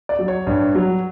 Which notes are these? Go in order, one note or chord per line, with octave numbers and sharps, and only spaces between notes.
D5
F#3
C#5
G2
F#3